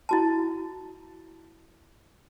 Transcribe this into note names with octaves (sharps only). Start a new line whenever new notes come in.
E4 F#4 A5